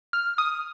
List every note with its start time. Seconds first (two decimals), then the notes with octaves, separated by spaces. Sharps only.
0.13 F6
0.38 D#6